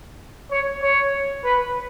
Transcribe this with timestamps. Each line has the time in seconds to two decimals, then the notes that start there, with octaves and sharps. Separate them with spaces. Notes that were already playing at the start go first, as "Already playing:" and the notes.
0.51 C#5
0.82 C#5
1.44 B4